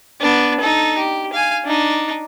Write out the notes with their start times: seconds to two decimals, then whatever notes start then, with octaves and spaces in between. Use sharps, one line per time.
0.20 B3 D4
0.61 D#4 A4
0.98 G4
1.33 F5 G#5
1.65 D4 D#4